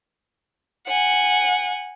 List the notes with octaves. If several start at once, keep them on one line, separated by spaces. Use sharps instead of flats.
F#5 G#5